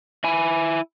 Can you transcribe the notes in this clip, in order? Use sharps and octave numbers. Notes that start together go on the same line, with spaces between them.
E4 G#5